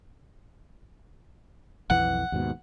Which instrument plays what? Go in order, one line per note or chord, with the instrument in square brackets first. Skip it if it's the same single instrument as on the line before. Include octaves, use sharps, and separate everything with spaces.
[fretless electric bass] B1 F2 E3 [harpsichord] F#5
[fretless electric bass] D#2 G#2 B2